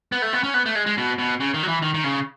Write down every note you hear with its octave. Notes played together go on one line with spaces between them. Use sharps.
B3
A3
B3
C#4
B3
A3
G#3
G#3
B2
B2
C#3
D#3
F#3
E3
D#3
D#3
C#3